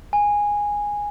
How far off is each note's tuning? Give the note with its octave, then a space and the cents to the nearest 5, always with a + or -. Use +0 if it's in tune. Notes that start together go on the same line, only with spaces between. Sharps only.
G#5 -10